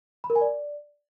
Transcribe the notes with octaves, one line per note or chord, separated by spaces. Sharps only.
B5
A#4
G#5
D5